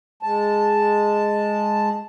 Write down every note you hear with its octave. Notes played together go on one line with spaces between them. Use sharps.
G#3 A5